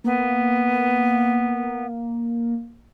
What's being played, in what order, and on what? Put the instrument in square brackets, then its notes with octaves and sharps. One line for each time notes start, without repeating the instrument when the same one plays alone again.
[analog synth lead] A#3 [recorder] B3